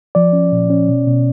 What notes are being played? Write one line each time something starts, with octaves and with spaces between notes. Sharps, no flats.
F3 D5
C#4
A#2
C#4
B2
B2